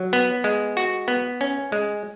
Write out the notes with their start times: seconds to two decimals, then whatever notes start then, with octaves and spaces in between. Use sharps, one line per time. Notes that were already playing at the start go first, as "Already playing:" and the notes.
Already playing: F#3
0.13 B3
0.44 G#3
0.77 F#4
1.08 B3
1.41 C#4
1.72 G#3